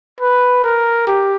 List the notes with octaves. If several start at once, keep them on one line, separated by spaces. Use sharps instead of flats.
B4
A#4
G4